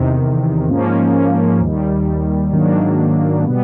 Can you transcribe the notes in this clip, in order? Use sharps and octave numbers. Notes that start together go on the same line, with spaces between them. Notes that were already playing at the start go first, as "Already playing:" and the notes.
Already playing: E2 C3 D#3
G#2 F3 A#3 C#4
D#2 D#3 G3
G#2 D#3 F#3 A#3 D4
B2 G3 B3